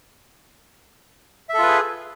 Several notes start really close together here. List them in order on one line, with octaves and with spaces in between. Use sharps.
E5 A4 F4 B4 G#4